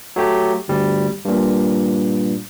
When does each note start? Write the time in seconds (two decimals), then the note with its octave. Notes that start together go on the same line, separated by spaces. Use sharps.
0.16 F#3 A3 G4
0.68 G1 D2 G3
1.25 G2 A#2